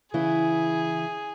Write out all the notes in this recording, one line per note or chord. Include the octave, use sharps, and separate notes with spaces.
C#3 E3 E4 G#4